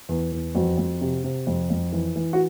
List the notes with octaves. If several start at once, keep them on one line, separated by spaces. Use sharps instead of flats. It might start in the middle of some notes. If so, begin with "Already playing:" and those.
E2
E2
F2 F#4
F2
C3
C3
F2
F2
E3
E3
F#4